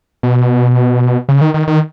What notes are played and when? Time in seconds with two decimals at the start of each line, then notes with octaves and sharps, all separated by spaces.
0.23 B2
1.29 C#3
1.41 D#3
1.54 D#3
1.67 D#3